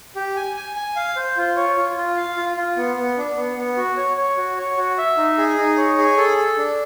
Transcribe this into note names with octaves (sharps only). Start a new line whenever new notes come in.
G4
G#5
G#5
G#5
F5
C5
F4
C#5
F4
F4
F5
F4
F4
B3
B3
D4
B3
B3
F#4
C#5
C#5
F#4
C#5
F#4
E5
D#4
G#4
D#4
C#5
G#4
A4
A4
D4